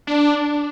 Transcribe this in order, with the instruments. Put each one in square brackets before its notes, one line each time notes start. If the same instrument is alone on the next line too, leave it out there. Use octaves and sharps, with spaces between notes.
[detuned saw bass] D4